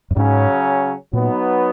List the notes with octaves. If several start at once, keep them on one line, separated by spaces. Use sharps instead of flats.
F#2
G#2 C#3 F#3 C#4
A#2 F#3 B3 D#4